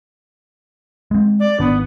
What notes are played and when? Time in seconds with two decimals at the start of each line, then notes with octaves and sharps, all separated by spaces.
1.11 G#3 C4
1.40 D5
1.60 G#1 D#3 B3 D4